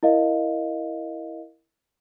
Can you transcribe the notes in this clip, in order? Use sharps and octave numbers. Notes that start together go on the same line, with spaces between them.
E4 A#4 D#5 F5